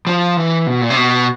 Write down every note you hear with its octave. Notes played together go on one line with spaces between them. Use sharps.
F3
E3
B2
A#2
C3
B2